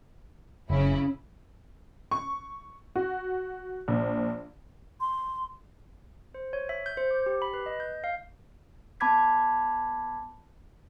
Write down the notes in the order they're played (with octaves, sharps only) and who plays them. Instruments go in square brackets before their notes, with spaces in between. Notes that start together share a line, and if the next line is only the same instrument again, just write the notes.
[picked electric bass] F#1 [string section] C#3 C#4 E4
[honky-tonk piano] C#6
F#4
A#1
[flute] C6
[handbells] C5
C#5
E5
G6
C5
D6
G4
B5
B4
D#5
G6
F5
[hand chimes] B3 A5 B5 D6 G#6 B6